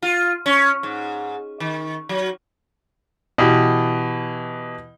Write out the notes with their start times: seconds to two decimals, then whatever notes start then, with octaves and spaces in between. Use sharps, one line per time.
0.02 F4
0.46 C#4
0.83 G#2
1.60 D#3
2.09 F#3
3.38 B2 E3 G4